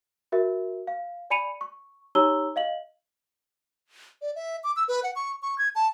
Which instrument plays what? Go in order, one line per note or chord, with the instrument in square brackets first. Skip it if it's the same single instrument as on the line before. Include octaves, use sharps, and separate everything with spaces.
[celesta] F#4 A#4 E5
F5
D5 G#5 B5 C#7 D#7 F7
C#6
D#4 G4 C#5 A#5 E6 G7
D#5 F5 F#7
[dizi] D5
E5
D6
E6
B4
F#5
C#6
C#6
G#6
A5